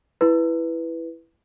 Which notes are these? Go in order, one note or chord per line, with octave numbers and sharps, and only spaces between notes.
E4 B4